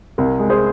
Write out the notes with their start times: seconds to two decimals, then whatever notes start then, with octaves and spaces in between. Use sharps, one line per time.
0.18 C2 A#4
0.39 G#3
0.50 G#4 C5